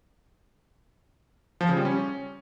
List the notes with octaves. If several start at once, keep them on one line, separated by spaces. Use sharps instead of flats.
F3
C#3
G3
C#4